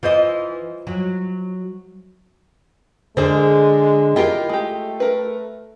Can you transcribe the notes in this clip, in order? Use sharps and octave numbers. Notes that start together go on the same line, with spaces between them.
E3 F4 C5 D#5
F#3
D3 G#3 G#4 A#4 C5
E4 F4 G4 A#4 D#5 G5
G#3 A3 G4
A#4 B4